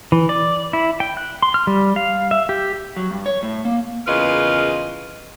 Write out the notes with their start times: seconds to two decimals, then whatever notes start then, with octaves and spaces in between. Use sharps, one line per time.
0.12 E3
0.29 D5
0.73 E4
1.00 G5
1.17 F#6
1.42 C6
1.54 F6
1.67 G3
1.96 F5
2.31 E5
2.49 G4
2.96 F#3
3.11 G2
3.26 C#5
3.43 A2
3.65 A#3
4.07 E2 C#3 F4 A#4 B4 D#5